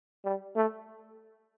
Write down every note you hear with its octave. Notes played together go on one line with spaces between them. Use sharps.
G3
A3